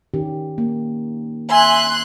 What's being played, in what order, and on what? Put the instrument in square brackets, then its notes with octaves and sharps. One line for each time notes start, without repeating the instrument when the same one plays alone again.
[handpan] D#3 C#4 G4
A#3
[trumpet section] E5 G#5 [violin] C6 F#6